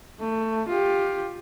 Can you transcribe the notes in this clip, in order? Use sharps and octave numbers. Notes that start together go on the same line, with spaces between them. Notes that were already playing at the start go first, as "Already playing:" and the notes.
A3
F4 G4